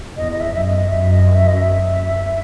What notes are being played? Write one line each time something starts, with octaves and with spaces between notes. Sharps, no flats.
E2 D#5
D#5
E5
F#2 E5
D#5
F#2 E5
D#5
E5
D#5
E5